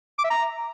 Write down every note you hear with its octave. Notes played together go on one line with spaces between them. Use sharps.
D6
E5
A#5